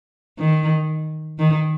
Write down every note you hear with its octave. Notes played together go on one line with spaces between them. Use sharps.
D#3
D#3